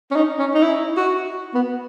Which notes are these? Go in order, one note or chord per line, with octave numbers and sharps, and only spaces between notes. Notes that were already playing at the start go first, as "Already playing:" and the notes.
C#4
D#4
C#4
D#4
E4
F#4
B3